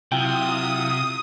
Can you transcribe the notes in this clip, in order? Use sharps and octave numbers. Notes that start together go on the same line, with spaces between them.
C3 F#3 E4 F4 G5 D#6